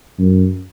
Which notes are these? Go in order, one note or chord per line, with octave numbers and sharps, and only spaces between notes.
F#2